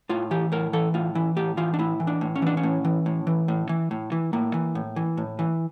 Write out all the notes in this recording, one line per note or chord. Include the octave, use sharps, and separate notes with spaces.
A2 F4
E3 G4
A2 A#4
E3 A4
A2 F4
E3 E4
A2 G4
E3 F4
D4
A2 E4
E3
D4
A2
C#4
E3 D4
C#4
A2
E3
A2
E3
A2
E3
A2
E3
A2 A#3
E3
A2
E3
A2
E3